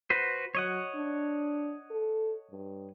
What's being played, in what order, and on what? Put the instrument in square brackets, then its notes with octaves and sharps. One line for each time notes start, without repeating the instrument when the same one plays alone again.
[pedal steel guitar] F#4 B4 C5
[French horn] F#3 [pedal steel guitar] C#5 D#5 F#5
[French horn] D4
A4
G2